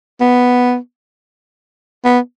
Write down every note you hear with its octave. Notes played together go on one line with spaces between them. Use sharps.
B3
B3